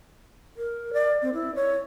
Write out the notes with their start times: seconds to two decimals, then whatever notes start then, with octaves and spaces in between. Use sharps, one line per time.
0.57 A#4
0.93 D5
1.22 C4
1.34 E4
1.55 C#5